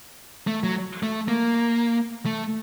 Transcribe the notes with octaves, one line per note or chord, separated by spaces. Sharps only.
A3
F#3
A3
A#3
A3